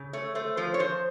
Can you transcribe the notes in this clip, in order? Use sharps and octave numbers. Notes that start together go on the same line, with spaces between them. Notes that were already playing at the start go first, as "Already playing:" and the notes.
Already playing: C#3
A3 C#5
A3 C5
F3 C5
C#5
F3 C5